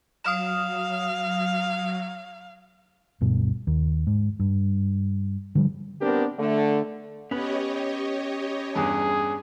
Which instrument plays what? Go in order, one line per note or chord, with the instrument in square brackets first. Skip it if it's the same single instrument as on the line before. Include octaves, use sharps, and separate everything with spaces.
[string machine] F#3 [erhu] F5 [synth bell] D#6 F6 E7
[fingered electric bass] D1 G2 B2
D#2
G#2
G2
D3 F3 G3
[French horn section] B3 C4 D4 G4 A#4
D3 A3
[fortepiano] B3 [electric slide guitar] C#4 B4 [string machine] G4 C#5 D#5
[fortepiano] E2 G2 [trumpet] G#4